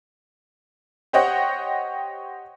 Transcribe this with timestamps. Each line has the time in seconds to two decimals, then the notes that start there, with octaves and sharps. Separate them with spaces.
1.13 G4 C5 C#5 D#5 F#5 G5